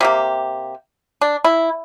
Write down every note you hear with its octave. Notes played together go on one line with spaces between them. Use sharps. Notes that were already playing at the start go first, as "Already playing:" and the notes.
C3 A#3 G4
D4
E4